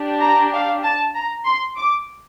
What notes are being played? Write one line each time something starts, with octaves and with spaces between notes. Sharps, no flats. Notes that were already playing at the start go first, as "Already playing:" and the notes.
Already playing: D4 G4
A#5
F5
A5
A#5
C6
D6